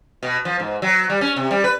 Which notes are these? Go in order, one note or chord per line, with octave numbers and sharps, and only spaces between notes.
B2
F3
G#2
F#3
G3
C#4
C3
G3
B4